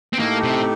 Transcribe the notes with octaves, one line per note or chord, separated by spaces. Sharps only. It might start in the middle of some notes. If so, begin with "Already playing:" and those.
C4
A2 A3 A#3 D#4 G4
C3